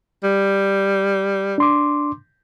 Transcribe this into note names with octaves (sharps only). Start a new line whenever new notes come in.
G3
D4 C6 D6